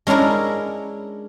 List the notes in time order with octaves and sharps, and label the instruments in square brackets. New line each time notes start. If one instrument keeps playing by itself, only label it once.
[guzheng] G#3 C#4 D4 E4 A#4